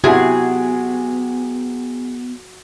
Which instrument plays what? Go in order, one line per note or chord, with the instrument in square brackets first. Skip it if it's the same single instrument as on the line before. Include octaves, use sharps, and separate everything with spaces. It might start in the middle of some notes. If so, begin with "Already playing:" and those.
[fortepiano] C3 E4 G#5 [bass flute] B3 [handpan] F#4 [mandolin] G#4